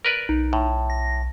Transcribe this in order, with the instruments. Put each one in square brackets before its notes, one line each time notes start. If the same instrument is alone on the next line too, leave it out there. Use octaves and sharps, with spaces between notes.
[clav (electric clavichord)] A#4 B4 D5
[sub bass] B1 [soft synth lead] D#4
[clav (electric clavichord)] A2
[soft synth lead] A#6